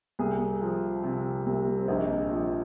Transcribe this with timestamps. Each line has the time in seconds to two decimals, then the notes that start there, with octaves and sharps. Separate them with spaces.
0.19 C2 G#4
0.61 F3
1.03 C3
1.46 C2
1.79 C4
1.88 A#1 D#4
2.31 F3